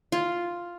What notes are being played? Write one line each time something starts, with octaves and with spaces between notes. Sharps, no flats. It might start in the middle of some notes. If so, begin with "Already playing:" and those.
F4